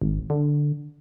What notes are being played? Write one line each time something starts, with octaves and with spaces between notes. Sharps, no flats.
G#1
D3